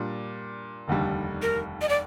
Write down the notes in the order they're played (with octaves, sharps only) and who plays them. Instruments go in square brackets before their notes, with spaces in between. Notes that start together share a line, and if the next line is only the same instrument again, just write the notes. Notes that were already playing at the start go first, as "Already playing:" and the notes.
Already playing: [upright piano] A#2 G3 D4
F1 D#2 D3 G3
[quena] A#4
D#5
D5